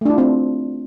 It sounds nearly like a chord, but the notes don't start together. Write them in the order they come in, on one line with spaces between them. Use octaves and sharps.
A3 D4 E4 F4 C4